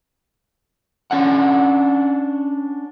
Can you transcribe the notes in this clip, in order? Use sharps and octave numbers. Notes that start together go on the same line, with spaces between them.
C#4 D4 F#5